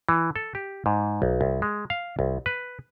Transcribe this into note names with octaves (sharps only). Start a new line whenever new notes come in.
E3
A4
G4
G#2
B1
C2
G#3
F5
C2
B4